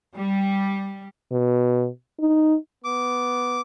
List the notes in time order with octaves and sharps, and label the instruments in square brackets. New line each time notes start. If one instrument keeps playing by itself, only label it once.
[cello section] G3
[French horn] B2
D#4
[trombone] B3 [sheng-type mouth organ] D6